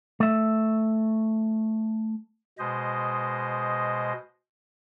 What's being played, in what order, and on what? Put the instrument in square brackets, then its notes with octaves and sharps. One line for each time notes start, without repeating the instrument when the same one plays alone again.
[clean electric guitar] A3 E5
[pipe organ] B2 G#3 C5 D#5